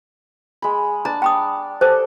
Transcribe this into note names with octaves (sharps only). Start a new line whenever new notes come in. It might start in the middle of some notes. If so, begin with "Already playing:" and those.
G#3 B5
D4 D5 A5 A#5
G5 B5 D#6
G4 A4 C5